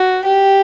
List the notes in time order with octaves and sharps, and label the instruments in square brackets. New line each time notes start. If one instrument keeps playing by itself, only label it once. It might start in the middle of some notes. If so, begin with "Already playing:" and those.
Already playing: [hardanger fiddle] F#4
G4